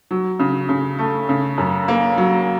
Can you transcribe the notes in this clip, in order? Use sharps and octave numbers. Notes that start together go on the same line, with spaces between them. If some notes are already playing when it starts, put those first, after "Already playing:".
F#3
C#3
C#3
A3
C#3
F#2
A#3
F#3